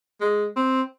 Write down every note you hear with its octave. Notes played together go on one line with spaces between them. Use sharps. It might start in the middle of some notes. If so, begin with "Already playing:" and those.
G#3
C4